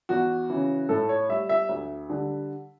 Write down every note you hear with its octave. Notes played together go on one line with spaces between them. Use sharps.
E2 F#4
C#3 E3
A2 A4
C#5
G3 E5
E5
D2
D3 G3